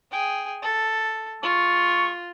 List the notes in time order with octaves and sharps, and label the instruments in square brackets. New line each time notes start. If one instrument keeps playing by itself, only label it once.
[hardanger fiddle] G#4 G5
A4
[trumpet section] G#3 C#6 [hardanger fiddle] F4